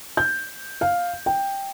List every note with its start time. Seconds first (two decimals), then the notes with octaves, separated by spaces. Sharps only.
0.17 G6
0.81 F5
1.26 G5